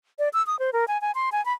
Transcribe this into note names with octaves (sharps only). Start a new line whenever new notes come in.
D5
E6
D#6
C5
A#4
G#5
G#5
C6
G#5
B5